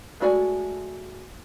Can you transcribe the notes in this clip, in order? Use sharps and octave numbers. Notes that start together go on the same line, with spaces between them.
G#3 A3 F#4 D5 G#5